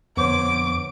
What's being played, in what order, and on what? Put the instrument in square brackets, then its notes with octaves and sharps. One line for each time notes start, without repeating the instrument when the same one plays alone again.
[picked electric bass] F2 D3 [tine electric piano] B3 C5 C#5 [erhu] D6